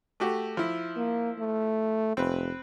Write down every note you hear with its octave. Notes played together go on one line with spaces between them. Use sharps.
A3 F#4 G4
F3 E4
A#3
A3
F1 C4 B4